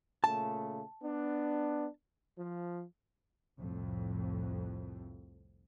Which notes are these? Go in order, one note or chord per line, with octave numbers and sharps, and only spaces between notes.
A#2 C#3 A3 A5
B3 D4
F3
C2 F2 A2